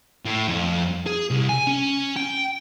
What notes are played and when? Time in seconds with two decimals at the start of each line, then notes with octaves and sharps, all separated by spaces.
0.25 A2
0.47 F2
1.06 G#4
1.31 C2
1.49 G#5
1.67 C#4
2.16 G5